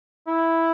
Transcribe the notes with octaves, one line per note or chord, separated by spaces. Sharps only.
E4